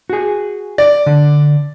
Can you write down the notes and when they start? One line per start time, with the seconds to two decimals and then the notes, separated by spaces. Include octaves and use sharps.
0.10 F#4 G#4
0.78 D5
1.06 D3